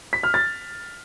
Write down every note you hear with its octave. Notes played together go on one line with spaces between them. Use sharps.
B6
F6
A6